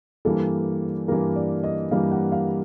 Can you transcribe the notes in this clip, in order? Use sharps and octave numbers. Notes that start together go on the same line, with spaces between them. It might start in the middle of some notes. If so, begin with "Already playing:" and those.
G2 E3 G3 A#3 A4
G2 E3 G3 A#3 A#4
D5
D#5
G2 E3 G3 A#3 F5
F#5
F5